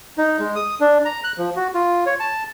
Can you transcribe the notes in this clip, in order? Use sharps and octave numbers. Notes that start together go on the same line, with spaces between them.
D#4
G#3
D#6
D4
A#5
F#6
F3
F#4
F4
C#5
A5